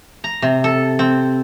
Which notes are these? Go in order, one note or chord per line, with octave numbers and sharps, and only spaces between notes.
A#5
C3
A4
C4